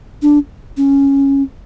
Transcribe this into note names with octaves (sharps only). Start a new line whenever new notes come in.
D4
C#4